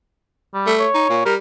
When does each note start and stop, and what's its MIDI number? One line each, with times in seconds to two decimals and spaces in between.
0.54 0.74 55
0.67 0.88 57
0.80 1.24 73
0.95 1.08 63
1.10 1.21 46
1.25 1.37 55
1.25 1.34 70